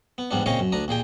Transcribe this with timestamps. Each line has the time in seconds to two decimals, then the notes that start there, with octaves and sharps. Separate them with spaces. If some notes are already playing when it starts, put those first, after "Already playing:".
0.18 B3
0.31 E2 G#2 G3 B3 D4
0.46 A#2 C#3 C4 C#5 D#5 F5
0.59 F#2
0.72 D2 D4 A#5 D#6
0.88 D#2 A#2 G#4 G5